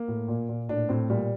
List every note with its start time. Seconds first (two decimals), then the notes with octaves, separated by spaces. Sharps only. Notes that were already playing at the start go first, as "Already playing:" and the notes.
Already playing: A#3
0.08 A2
0.28 A#2
0.49 A#2
0.69 A2 D4
0.89 A2 C4
1.10 A#2 G3